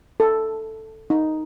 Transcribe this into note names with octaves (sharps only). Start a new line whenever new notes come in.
A4
D#4